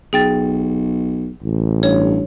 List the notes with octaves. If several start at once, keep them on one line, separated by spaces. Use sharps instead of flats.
B1 G#4 G5 A6
A1
G2 C#5